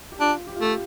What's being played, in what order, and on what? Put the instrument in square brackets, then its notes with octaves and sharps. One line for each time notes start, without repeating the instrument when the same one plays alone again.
[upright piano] G4
[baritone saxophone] D4 [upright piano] F4
[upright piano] G4
F4
[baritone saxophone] A3 [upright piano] G4